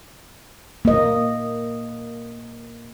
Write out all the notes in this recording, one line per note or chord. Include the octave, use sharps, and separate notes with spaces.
A#3 D#5